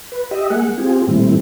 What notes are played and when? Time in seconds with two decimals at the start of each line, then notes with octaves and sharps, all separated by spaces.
0.12 B4
0.31 G4 D#5 E5
0.50 G#3 A#3 G#4 F#5
0.78 C4 F4 G4 G#4
1.07 A#2 D#3 G3 A3 C4 E4